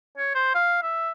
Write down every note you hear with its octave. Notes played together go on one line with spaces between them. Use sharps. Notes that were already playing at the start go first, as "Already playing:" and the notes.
C#5
C5
F5
E5